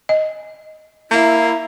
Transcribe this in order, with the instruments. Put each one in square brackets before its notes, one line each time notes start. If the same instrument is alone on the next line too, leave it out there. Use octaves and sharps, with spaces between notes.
[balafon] D#5
[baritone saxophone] A#3 [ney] E4 [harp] E5 A#5